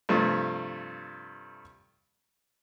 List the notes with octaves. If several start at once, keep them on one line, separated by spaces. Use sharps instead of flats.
G2 C3 F3 A3